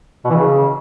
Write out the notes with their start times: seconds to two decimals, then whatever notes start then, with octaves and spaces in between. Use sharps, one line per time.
0.25 B2
0.30 E3
0.35 C#3